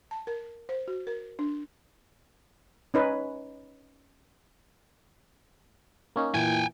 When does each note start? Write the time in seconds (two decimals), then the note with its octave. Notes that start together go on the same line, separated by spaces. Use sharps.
0.11 A5
0.27 A#4
0.69 C5
0.88 F#4
1.07 A#4
1.39 D4
2.94 C#4 D#4 B4
6.16 A#3 C#4 D#4
6.34 A#2 E3 G5 G#5